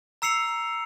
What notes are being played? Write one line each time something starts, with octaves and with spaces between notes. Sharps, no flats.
A#5 E6 C7 C#7 F7